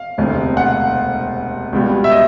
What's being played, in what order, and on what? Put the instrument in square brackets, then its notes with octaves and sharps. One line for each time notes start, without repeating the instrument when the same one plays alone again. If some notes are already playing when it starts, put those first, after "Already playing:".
Already playing: [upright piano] F5
E1 D2 C3
F#5
C#2 B2 G3
E5
D#5